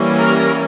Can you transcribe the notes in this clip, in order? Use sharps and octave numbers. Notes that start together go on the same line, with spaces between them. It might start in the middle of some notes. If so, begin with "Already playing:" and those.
Already playing: E3 G3 A#3 C#4
A#4